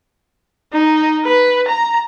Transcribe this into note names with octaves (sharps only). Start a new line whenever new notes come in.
D#4
B4
A#5